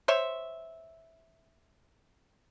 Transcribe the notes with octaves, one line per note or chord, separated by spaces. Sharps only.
C5 C#5 E5